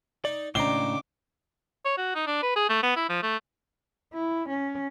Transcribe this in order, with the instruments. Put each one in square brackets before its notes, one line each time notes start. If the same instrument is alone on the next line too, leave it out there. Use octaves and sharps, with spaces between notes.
[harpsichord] D#4 [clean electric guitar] D5
[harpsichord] C#2 D#3 C5 [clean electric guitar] A2 A#5 [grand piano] D4 G7 [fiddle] D6
[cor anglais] C#5
F#4
D#4
D4
B4
G#4
A3
B3
E4
F3
A3
[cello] E4
C#4